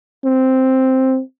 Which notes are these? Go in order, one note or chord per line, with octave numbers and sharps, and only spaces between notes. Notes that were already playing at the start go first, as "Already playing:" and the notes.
C4